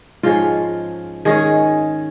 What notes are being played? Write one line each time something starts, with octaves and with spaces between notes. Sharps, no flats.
G#2 F3 G#3 C#4 F4
D#3 G#3 C#4 G#4